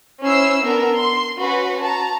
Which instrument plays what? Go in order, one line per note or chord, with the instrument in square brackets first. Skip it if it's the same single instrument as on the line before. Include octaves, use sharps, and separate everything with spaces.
[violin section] C#4 E4 C5 B5 E6 C7
B3 D4 A#4
C6
C#4 F#4 B4
A5 A#5